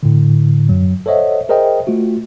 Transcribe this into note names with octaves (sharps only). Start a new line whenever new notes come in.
A2 D3
F#2 F#3
A4 C5 C#5 D#5 E5 F#5
G#4 A#4 C5 D#5 E5 G5
A3 F4 F#4